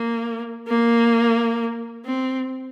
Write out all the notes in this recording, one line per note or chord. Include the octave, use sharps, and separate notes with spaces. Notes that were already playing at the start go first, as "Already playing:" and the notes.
Already playing: A#3
A#3
C4